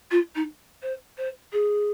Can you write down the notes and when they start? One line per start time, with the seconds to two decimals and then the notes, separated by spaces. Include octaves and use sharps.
0.11 F4
0.35 D#4
0.82 C5
1.18 C5
1.53 G#4